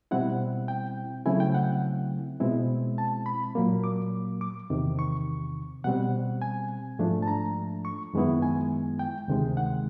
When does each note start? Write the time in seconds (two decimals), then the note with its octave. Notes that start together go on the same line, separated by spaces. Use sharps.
0.11 B2 G3 C4 E4 F#5
0.68 G5
1.25 C#3 F#3 A3 C4 E4 G#5
1.40 G5
1.55 F#5
2.40 B2 G#3 C4 E4
2.98 A5
3.26 B5
3.55 A#2 F#3 A#3
3.84 D6
4.41 D6
4.70 E2 C3 D#3
4.99 C#6
5.84 B2 G3 C4 F#5
6.42 G#5
6.99 G#2 F3 A3 D4
7.22 A5
7.28 A#5
7.85 C#6
8.13 F#2 D#3 G#3 B3 E4
8.42 G#5
8.99 G5
9.28 D2 C3 D#3 G#3
9.57 F#5